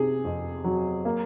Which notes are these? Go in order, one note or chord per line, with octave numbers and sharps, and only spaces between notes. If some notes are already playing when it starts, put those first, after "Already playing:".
Already playing: C3 G#4
F2
F#3
A#3